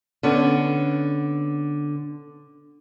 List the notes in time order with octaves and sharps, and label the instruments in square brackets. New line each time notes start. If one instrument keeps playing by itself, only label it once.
[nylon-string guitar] D3 B3 C#4